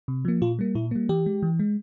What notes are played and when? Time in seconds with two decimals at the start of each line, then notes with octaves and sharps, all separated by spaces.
0.08 C3
0.25 F3 A#3
0.42 A#2 F4
0.59 G3 A#3
0.75 A#2 E4
0.91 G3 A#3
1.09 E3 G4
1.26 G#3
1.42 E3
1.59 G#3